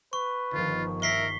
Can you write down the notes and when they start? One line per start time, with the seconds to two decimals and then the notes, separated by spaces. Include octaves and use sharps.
0.13 B4 C#6
0.53 G1 D#3 F3 F4
1.02 A#4 E5 B6 C7 G7